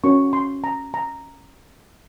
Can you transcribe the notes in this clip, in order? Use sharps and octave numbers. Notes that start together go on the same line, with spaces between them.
C#4 F#4 A#4 C#5 C#6
C6
A#5
A#5